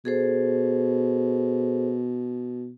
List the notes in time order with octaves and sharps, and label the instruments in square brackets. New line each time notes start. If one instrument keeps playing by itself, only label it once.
[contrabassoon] B2 [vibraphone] G#4 A4 C5